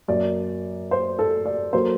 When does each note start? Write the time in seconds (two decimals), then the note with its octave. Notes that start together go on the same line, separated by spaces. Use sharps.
0.08 F#2 F#3 A#3 D5
0.91 C5
1.19 A4
1.46 D5
1.73 F#3 A#3 C5